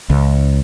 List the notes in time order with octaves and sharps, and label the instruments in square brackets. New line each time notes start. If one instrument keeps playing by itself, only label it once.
[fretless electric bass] C#2